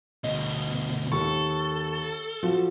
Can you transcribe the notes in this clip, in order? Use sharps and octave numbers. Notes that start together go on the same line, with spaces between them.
D2 B2 D#5
D#2 A4 C#6
F3 F#4